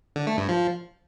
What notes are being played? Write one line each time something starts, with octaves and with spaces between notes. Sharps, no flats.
D3
A3
G2
F3